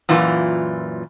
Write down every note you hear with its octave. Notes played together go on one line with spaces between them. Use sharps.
F#2 A#2 E3 F4